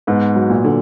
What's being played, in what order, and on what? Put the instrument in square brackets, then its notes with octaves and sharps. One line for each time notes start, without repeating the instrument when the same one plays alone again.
[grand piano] G#2 [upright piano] B3
[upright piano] F#3
[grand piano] A#2
[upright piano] D3